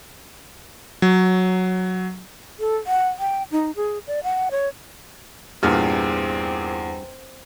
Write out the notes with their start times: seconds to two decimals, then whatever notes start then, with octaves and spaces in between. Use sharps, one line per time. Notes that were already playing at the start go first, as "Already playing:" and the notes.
1.02 F#3
2.60 A4
2.87 F#5
3.19 G5
3.51 D#4
3.76 G#4
4.07 D5
4.24 F#5
4.51 C#5
5.63 E2 G2 A#2 C4 F6